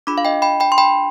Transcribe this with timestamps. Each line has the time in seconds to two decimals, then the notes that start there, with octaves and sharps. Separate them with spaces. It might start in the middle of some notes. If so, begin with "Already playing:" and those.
0.07 D4 F4 G#4 B5 D6
0.18 F5
0.25 D#5 G5
0.42 G5 B5
0.60 G5 B5
0.72 C6
0.78 G5 B5